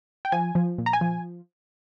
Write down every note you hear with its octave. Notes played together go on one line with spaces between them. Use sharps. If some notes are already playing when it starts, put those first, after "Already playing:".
G5
F3 G#5
F3
A#2
A#5
G#5
F3